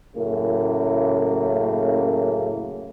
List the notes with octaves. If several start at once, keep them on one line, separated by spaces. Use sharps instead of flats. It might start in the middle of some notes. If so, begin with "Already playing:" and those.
F#2 A2 C#3 A#3